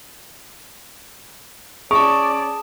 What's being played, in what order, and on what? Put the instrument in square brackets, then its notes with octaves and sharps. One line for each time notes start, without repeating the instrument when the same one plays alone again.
[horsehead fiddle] C#4 D5 [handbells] G#4 A5 [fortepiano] C#6